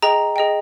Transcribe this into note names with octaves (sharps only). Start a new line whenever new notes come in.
G#4 D#5 G5 A#5
G#4 D#5 G5